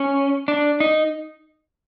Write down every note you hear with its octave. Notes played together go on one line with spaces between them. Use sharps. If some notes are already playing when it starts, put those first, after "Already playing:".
Already playing: C#4
D4
D#4